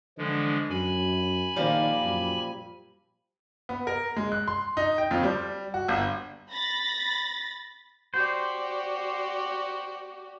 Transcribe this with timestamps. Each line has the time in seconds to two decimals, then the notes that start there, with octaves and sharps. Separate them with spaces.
0.18 D3 E3 F3 G#3
0.70 F#2 G#5 B5
1.56 A#2 D#3 F3 G3
2.03 F#2
3.69 B3
3.87 A#4
4.16 G#3
4.32 F#6
4.48 C6
4.77 D#4
4.98 G5
5.11 F2
5.23 G3
5.74 F#4
5.88 G1
6.52 B5 A6 A#6
8.14 F#4 G4 C5 D5